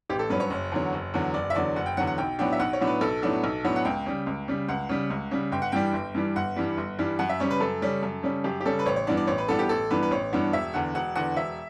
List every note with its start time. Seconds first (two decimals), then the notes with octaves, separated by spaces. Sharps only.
0.09 A1 G4
0.19 A4
0.30 G2 F#3 C#4 B4
0.40 C#5
0.50 F#1
0.72 E2 D3 F#3
0.93 F#1
1.14 E2 D3 F#3
1.34 F#1 D5
1.50 E5
1.55 E2 D3 F#3 D5
1.76 F#1 F#5
1.86 G5
1.97 E2 D3 F#3 F#5
2.07 F#5
2.18 B1 G5
2.39 A2 F#3 B3 D4 G5
2.52 E5
2.60 B1 F#5
2.73 C#5
2.81 A2 F#3 B3 D4
2.87 B4
3.01 B1 A4
3.23 A2 F#3 B3 D4
3.44 B1
3.64 A2 F#3 B3 D4
3.76 F#5
3.85 C#2 G5
4.06 C#3 G3
4.26 C#2
4.48 C#3 G3
4.68 C#2 F#5
4.89 C#3 G3
5.10 C#2
5.31 C#3 G3
5.52 G1 G5
5.62 F#5
5.72 G2 E3 G3 G5
5.93 G1
6.15 G2 E3 G3
6.36 G1 F#5
6.56 G2 E3 G3
6.77 G1
6.99 G2 E3 G3
7.19 F#2 F#5
7.29 E5
7.40 C#3 G3 C#4 C#5
7.50 B4
7.60 F#2 A4
7.82 C#3 G3 C#4
8.03 F#2
8.23 C#3 G3 C#4
8.44 F#2 G4
8.61 G4
8.65 C#3 G3 C#4 A4
8.79 B4
8.86 A1 C#5
8.96 C#5
9.07 G2 E3 B3 D4 D5
9.17 D5
9.27 A1 C#5
9.38 B4
9.48 G2 E3 B3 D4 A4
9.59 G4
9.69 A1 A4
9.90 G2 E3 B3 D4 B4
10.03 B4
10.11 A1 C#5
10.33 G2 E3 B3 D4
10.53 E1 E5
10.74 E2 D3 F#5
10.95 E1 F#5
11.15 E2 D3 F#5
11.36 E1 E5